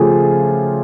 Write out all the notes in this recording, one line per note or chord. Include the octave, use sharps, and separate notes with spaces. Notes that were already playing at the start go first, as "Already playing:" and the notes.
Already playing: C#3 F3 A3 F4 G4 G#4